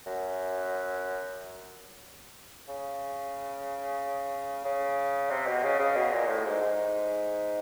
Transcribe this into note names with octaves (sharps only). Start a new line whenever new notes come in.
F#2
C#3
C#3
C3
B2
C#3
C#3
B2
A#2
A2
G#2
G#2